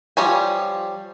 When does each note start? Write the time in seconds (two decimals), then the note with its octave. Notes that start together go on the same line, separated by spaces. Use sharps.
0.17 F3 G3 C#5 G#5